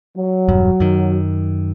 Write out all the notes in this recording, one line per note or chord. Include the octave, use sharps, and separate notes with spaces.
F#3
E1 G2
F#2 D#3